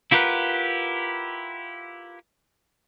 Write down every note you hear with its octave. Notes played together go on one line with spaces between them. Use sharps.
E4 F4 G4 A#4 B4 F#5